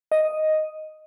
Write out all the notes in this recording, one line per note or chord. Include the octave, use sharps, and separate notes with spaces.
D#5